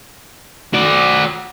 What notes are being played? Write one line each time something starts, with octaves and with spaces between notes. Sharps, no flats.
F#4 D5